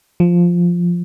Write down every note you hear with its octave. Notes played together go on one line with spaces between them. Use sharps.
F3